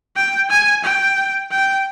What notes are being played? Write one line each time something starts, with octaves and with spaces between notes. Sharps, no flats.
G5
G#5
G5
G5